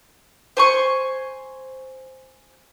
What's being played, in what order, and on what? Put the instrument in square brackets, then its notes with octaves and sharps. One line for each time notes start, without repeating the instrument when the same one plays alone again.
[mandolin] C5 G#5 C#6